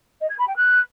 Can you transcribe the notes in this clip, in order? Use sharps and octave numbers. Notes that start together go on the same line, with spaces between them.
D#5
G#6
B5
G5
F#6